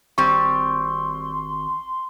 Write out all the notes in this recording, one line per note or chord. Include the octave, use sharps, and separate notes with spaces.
G#1 G3 C4 C6 C#6